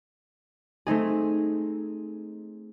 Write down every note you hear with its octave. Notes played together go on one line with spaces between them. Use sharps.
A3 C4 D#4 G#4